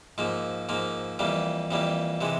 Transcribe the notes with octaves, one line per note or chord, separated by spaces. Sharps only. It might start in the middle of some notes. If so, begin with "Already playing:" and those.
G#2 F3 A#3
G#2 F3 A#3
F2 E3 G3 A#3
F2 E3 G3 A#3
C3 E3 G#3